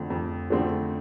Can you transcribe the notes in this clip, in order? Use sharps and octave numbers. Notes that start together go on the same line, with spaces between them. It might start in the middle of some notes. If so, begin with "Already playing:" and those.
Already playing: F2 D3 F3 A3 C4
F2
D3 F3 A3 C4